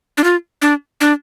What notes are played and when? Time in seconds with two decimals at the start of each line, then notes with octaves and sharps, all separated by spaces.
0.18 D4
0.24 F4
0.62 D4
1.01 D4